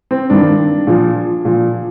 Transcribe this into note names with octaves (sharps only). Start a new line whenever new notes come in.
C4
G2 D#3 D4
A#2 F3
A#2 F3